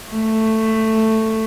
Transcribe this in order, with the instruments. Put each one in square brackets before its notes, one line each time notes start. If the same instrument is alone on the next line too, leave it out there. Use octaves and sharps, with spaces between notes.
[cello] A3